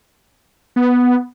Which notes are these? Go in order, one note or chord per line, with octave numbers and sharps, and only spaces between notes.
B3